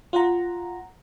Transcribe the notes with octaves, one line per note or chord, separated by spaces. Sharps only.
F4 F#5 A#5